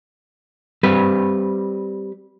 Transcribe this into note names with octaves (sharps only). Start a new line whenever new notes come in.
G3 C4 B4